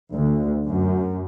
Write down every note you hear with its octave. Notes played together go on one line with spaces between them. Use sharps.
D2
F#2